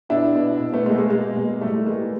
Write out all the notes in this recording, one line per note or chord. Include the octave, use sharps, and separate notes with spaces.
B2 D4 E4
B2
B2
A3 B3
B2 G#3 A#3
A3
G#3 A#3
B2 G#3 A#3
B2
A2 G3 A3
E3 G#3 A#3